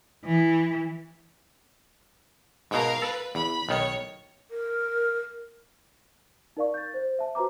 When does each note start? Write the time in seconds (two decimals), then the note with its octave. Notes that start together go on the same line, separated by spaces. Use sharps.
0.25 E3
2.71 G#2 B2 A#4 F5
3.02 A4 B4
3.35 E2 B5
3.69 B1 D#3 C#5
4.51 A#4
6.57 D#4 A#4 D5 F5 C#6
6.74 G6 A6
6.94 C5
7.19 E5 A5
7.35 F#4 B4 C5 A#5 D6